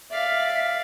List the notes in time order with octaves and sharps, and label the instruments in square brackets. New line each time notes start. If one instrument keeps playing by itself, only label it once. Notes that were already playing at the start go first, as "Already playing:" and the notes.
[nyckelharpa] D5 F5 [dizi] E5